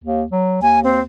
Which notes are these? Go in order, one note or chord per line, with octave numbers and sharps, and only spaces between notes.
D#2
F#3
D#2 G#5
C4